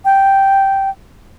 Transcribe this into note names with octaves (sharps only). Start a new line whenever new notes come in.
G5